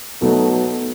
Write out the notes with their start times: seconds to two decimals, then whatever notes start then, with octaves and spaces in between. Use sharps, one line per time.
0.21 B2 F#3 A3 B3 D#4